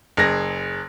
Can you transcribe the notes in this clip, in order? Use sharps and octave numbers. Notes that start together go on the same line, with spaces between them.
F#1 G#4 A#6